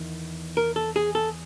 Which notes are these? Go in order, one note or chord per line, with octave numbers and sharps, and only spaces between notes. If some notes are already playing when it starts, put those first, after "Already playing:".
Already playing: E2 D#3
A#4
A4
G#4
A4